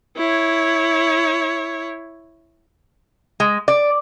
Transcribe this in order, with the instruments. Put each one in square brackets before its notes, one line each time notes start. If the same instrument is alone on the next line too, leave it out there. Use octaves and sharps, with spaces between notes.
[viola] E4 C#5
[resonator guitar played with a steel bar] G#3
D5